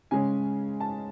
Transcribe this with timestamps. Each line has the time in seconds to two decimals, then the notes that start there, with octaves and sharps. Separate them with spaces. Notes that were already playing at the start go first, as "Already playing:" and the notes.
0.11 C#3 G#3 C#4 G#5
0.80 A5